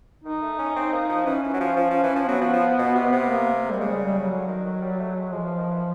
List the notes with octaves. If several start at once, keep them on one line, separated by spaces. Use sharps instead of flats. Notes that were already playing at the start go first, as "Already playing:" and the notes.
D#3 D#4
A3
C#4
C4
A#3
F3
E3 C#4
E3
F#3
F3
F3
F3
E3
F3
F#3 B3
F3
F3
B2
C3
C3
A#3
A#3
C3 G3
C#3 G#3
G3
G3
F#3
D3
D#3
D#3
G3
A3
G#3
F3 G#3
E3
D#3
E3